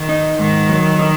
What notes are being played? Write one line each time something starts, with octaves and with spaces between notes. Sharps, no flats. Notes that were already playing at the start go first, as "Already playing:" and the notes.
Already playing: D#3
D#4
G#2 D#3
F#3
D#4